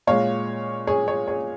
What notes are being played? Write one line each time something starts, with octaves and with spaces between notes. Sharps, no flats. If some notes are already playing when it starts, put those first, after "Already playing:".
A#2 G#3 C#5 F5
G#4 C#5
G#4 C#5
G#4 C#5